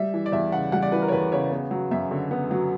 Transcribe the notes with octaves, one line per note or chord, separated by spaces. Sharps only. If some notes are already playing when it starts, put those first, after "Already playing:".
Already playing: G3 E5
E3
D5
E2 E5
C#3 F#5
G3 F#5
D5
E3 B4
A#4
C#5
E2 B4
C#3 C#5
B3
F#3
F#2 E5
D3
B3
F#3